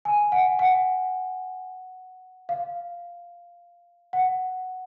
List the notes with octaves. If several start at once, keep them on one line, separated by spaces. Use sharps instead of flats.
G#5
F#5
F#5
F5
F#5